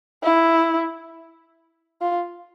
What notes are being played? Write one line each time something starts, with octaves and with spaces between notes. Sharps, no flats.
E4
F4